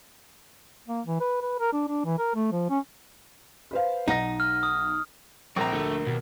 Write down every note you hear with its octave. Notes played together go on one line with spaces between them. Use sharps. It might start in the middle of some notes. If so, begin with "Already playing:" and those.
A#3
E3
B4
B4
A#4
D4
D4
E3
A#4
A3
F3
C#4
B4 C5 F5
B1 D#4 F#5 A#6
F6
D#6
A#1 C4 A#5
D2 A3 A#4
D#2 B2